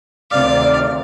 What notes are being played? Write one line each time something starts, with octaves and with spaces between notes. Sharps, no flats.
D2 C3 D#3 D5 F5